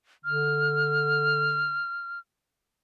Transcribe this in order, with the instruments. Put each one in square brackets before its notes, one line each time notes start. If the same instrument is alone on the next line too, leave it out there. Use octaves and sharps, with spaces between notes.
[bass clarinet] D3 [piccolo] F6